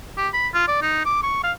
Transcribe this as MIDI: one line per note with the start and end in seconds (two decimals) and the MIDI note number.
0.17 0.28 67
0.33 0.48 83
0.54 0.66 65
0.68 0.82 74
0.82 1.05 63
1.06 1.22 86
1.23 1.42 85
1.44 1.52 77